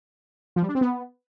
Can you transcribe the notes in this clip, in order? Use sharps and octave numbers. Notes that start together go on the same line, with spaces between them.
F3
G3
D4
C4
B3